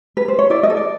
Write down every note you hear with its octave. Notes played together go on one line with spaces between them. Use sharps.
B4
C5
C#5
E4 D5
D#5
A4
D5